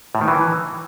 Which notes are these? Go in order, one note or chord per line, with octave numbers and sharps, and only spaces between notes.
A2
D#3
E3